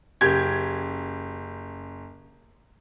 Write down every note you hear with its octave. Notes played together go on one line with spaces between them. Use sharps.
F#1 G4 G6 G#6